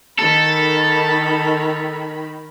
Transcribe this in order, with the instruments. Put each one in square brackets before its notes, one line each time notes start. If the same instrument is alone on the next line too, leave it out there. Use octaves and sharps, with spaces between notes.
[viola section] D#3 B5 [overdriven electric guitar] A4